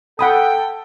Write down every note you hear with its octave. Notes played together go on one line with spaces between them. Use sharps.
A4 F#5 G5 B5 D#6